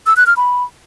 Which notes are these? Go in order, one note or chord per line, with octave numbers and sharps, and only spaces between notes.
E6
F#6
F6
B5